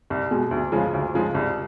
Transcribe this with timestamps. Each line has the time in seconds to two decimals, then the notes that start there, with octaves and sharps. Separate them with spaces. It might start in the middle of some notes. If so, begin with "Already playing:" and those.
0.10 C2
0.31 B2 G#3
0.51 D2
0.72 C#3 F3 G#3
0.93 D2
1.14 C#3 F3 G#3
1.34 C2